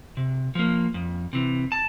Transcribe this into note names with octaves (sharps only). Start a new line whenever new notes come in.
C3
F3 A#3
F2
C3 E3
A5